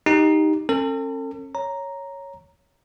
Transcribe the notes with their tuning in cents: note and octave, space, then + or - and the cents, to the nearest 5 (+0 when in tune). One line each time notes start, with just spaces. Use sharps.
D#4 +5 G4 +0
C#4 -40 A4 +40
C#5 +0 A#5 +0